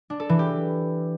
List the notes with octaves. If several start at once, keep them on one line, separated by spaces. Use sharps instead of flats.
D4
A4
E3
G4